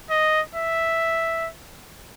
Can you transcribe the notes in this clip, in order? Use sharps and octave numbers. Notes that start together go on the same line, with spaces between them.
D#5
E5